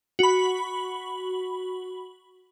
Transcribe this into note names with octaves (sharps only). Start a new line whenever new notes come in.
F#4 B5